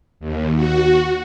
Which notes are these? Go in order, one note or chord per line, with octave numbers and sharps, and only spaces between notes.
D#2
F#4